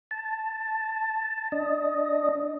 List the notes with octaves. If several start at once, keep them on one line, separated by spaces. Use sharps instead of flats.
A5
D4 D#5